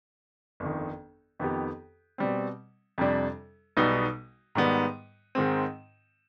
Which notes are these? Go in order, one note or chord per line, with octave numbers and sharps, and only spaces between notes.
G1 F2 D#3
F2 D#3 B3 D#4 G4
B2 G3 C4
F2 C3 G3 D4
B1 B2 G3 B3 D#4
G#2 D#3 G3 B3
G#2 D#3 G#3 C4